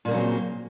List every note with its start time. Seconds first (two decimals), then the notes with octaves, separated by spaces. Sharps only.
0.05 A#2
0.08 A#3
0.11 C#3
0.14 F#3
0.17 C4